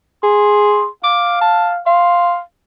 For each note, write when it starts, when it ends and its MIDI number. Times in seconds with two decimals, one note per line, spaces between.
0.23 0.87 68
0.23 0.88 84
1.04 1.82 77
1.04 1.39 86
1.41 1.70 81
1.87 2.40 77
1.87 2.40 84